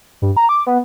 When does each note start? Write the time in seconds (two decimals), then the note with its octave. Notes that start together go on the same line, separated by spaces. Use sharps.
0.22 G2
0.37 A#5
0.49 D6
0.67 B3